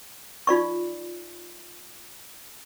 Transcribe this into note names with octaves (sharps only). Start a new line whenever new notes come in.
D#4 F4 D5 C#6